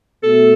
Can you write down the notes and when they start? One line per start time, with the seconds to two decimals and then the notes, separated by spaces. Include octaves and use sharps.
0.23 B2 A3 A4